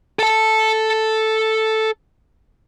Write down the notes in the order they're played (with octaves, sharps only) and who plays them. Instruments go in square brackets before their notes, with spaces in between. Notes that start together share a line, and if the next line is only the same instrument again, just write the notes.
[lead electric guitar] A4 A5